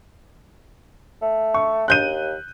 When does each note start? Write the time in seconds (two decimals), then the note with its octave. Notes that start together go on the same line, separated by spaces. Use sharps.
1.22 A3
1.54 C#6
1.88 D#2 F#6 G6 D#7